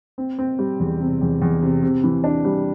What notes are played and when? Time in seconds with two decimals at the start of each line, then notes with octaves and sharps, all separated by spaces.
0.18 C4
0.39 C4
0.59 G3
0.80 E2
1.00 C3
1.21 E2
1.42 E2
1.63 C3
1.83 C3
2.04 E3
2.24 D4
2.45 G3